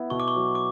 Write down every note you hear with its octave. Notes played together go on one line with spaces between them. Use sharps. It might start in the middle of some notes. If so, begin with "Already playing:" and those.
Already playing: B3 E4
B2 C#6
D6
C#6
F#3
D6